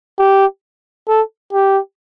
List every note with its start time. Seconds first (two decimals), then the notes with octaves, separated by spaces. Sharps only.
0.19 G4
1.08 A4
1.53 G4